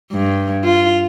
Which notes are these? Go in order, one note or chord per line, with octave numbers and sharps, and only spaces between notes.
G2
F4